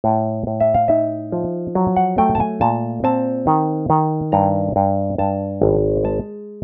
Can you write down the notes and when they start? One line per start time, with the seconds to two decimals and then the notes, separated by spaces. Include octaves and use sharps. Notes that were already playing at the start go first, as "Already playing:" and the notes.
0.04 A2
0.47 A2
0.60 E5
0.74 F5
0.88 D#4 E5
1.32 F3
1.75 F#3
1.96 F#5
2.18 A3 G5
2.35 A5
2.40 G#5
2.61 A#2 A5
3.04 C4 A5
3.47 D#3
3.90 D#3
4.32 G2 A#5
4.76 G2
5.18 G2 A5
5.62 G#1
6.04 G#3 A5